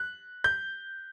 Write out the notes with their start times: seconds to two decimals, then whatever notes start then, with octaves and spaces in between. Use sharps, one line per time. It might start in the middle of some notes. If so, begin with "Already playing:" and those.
Already playing: F#6
0.44 G6